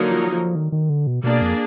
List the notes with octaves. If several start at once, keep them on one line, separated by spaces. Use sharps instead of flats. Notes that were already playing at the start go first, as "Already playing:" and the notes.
Already playing: D3 F#3 A#3 D#4 A#4
F3
F3
D#3
D#3
D3
B2
B2 A#3 D4 G#4 D5
F2